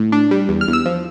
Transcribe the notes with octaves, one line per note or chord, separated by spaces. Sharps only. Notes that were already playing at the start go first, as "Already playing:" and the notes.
Already playing: A2
D4
G3
E2
F6
E2
E6
F3